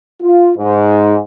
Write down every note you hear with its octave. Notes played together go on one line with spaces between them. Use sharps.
F4
G#2